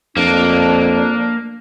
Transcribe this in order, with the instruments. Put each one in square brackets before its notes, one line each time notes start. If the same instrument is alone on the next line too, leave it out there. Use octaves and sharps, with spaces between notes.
[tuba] F2 [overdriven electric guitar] A#3 [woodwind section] D4